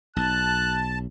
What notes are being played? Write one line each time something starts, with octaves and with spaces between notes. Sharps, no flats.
B1 A5 F#6